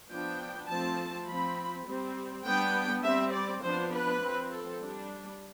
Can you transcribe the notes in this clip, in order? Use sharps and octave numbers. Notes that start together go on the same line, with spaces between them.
F3 B3 D4 G5
F3 A3 C4 A5
F3 C4 B5
G3 C4
G3 B3 D4 G5
G3 C4 E5
D5
F3 B3 D4 C5
B4
F3 C4
A4
G3 D4